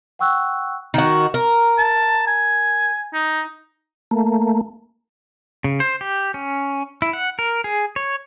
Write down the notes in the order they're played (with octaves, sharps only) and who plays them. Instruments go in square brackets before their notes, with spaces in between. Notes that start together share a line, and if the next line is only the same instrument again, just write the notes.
[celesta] F#5 G5 C#6 E6 F#6
[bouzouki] D#3 F#4
A#4
[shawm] A5
G#5
D#4
[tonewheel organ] A3 A#3
[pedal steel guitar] C#3
C5
G4
C#4
E4
F#5
A#4
G#4
C#5